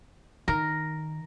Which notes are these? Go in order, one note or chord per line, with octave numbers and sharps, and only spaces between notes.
D#3 A#4